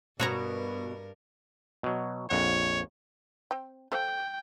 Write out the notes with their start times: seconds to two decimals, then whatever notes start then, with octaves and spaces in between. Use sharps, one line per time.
0.20 G2 B2 F#4 A#4 C#5 A#5
1.83 B2 F#3
2.30 A#1 F2 C#5 F#5
3.51 C4 G5
3.92 A4 C5 F5 G5